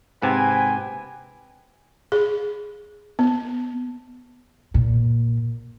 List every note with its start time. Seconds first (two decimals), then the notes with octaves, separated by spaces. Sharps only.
0.22 G#2 C3 B4 G5 G#5
2.12 G#4
3.19 B3
4.74 A#2